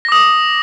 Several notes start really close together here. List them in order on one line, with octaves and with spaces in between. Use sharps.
A#6 D6 D#6